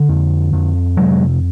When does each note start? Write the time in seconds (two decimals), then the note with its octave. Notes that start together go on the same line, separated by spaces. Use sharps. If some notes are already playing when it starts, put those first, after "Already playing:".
Already playing: D3
0.09 F2
0.53 F2
0.97 C3 F#3 G#3